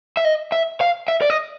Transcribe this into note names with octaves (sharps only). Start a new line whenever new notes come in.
E5
D#5
E5
F5
E5
D5
D#5